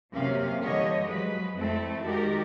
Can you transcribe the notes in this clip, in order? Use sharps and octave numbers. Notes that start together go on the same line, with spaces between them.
C3 F#3 A#3 C#4 F5
D3 E3 G3 G4 C#5 D#5
F3 F#3 G#3 B4
F2 A3 C4 E4 A4
D#3 G#3 F#4 G4 A#4 D5